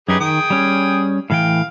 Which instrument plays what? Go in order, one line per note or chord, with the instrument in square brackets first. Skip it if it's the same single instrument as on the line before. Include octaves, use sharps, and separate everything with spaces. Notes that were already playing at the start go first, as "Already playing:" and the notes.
[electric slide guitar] F#2 D#4 [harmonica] G4 G#4 B4
[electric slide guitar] D#3 [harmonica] G#4 G5 D#6
[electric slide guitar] G3 C#4
[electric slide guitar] A2 E3 G5 [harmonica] F5